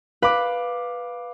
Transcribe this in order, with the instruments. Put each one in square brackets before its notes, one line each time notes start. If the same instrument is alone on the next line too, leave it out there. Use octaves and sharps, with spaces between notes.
[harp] B4 [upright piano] F5 D6